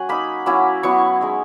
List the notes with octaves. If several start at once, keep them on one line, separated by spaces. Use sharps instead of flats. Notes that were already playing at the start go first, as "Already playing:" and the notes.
Already playing: F#3 C#4 F#5 G#5
A#3 D#4 B5
F#3 A#3 C#4 E4
F#3 B3 E4 C#6
G#3 D#4